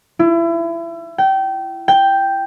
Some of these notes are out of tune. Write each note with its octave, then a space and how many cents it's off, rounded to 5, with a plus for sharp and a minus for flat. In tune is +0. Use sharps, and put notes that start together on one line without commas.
E4 +30
G5 -25
G5 +0